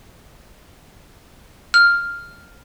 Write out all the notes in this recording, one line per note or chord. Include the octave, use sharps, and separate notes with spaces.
F6